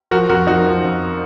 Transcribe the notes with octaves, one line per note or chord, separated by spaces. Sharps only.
F3 F#4 A#4
F2 F#4 A#4
F3 D#4 F#4
F3
F2